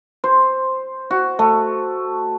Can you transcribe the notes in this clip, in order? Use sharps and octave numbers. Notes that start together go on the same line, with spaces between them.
C5
F#4
A3